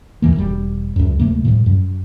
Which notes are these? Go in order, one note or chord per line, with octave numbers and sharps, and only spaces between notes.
B1 E2 E3 A#3
E1 G3
C#2 F#2
D1 C3 A3 A#3
A2 C3 E3 G3
F#2